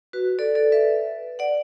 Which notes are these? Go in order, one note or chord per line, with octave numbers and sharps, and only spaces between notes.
F#4 B4
A4 D5
A4 D5
B4 E5
D5 F#5